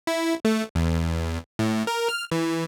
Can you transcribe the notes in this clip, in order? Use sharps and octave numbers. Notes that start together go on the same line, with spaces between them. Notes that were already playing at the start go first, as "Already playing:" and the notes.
E4
A3
E2
A2
A#4
F6
E3